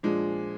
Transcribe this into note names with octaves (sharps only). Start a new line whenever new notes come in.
A#2 F3 G#3 D4